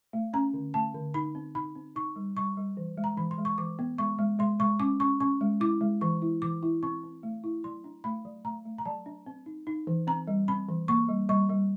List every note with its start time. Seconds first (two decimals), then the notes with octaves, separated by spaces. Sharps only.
0.13 A3
0.33 C#4 A#5
0.54 D3
0.74 A3 A5
0.94 D3
1.14 D#4 B5
1.35 C4
1.55 D#4 B5
1.75 C4
1.96 D#4 C#6
2.16 G3
2.36 G3 C#6
2.57 G3
2.77 E3
2.98 G#3
3.04 A#5
3.17 E3 B5
3.31 C6
3.38 G#3
3.45 C#6
3.58 E3 D6
3.79 B3
3.98 G#3 C#6
4.19 G#3
4.39 G#3 C6
4.60 G#3 C#6
4.80 C#4 D6
5.00 C#4 C#6
5.20 C#4 C#6
5.41 G#3
5.60 E4 D6
5.81 G#3
6.01 E3 C#6
6.22 E4
6.42 E3 D6
6.63 E4
6.83 C4 C#6
7.03 C4
7.23 A3
7.44 E4
7.64 F#3 C6
7.84 D4
8.04 A3 B5
8.25 F#3
8.45 A3 A#5
8.65 A3
8.78 A#5
8.85 F#3 A5
9.06 D4
9.26 C4
9.46 D#4
9.67 D#4
9.87 E3
10.07 C4 A#5
10.27 G3
10.48 C4 B5
10.69 E3
10.88 A#3 C#6
11.09 G3
11.29 G3 C#6
11.49 G3